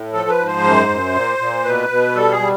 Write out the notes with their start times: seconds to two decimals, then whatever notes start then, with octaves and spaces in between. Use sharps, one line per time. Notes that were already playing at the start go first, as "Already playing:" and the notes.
Already playing: A2
0.13 F3 A4
0.29 B4
0.38 G#2
0.47 C5
0.63 F#2
0.89 F#2
1.14 A#2
1.39 A#2
1.64 B2 B4
1.89 B2
2.15 G3 A4
2.31 G#4
2.39 G3